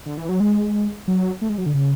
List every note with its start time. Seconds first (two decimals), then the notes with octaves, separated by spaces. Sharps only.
0.06 D3
0.17 E3
0.29 F#3
0.40 G#3
1.08 F#3
1.42 A3
1.49 G#3
1.58 F#3
1.66 D3
1.74 C#3